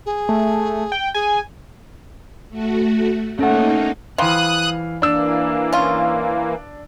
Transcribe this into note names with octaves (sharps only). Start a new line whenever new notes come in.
G#4
A3
G5
G#4 G#5
A3 F#4
A3 A#3 C#4 D#4 F#5
E3 F3 G3 F5 D#6 F#6
E3 A#3 D4 E6
C#4 F4